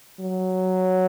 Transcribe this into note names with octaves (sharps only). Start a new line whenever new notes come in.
F#3